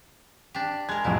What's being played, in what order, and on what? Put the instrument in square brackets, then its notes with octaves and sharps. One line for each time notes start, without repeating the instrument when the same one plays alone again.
[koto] D4 G4
[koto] G#3 A#4 [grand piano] G#6
[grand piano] C2 F2 A2 [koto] E4